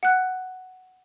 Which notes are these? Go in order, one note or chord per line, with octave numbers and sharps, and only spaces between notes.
F#5 F#6